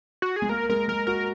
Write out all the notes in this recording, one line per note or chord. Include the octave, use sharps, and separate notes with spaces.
F#4
G#4
G#3
A#3 A#4
G#3 A#4
G#3 A#4
F#4 A#4